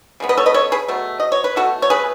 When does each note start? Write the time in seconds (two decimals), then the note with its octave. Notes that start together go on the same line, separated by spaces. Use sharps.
0.20 C#3 G#3 B3
0.29 B4 D#5
0.37 A4 C#5
0.46 B4 D#5
0.54 A4 C#5
0.72 G#4 B4
0.88 B2 F#3 A3
1.20 D#5
1.32 C#5
1.44 B4
1.56 B2 A3 F#4 A4
1.82 C#5
1.90 G#4 B4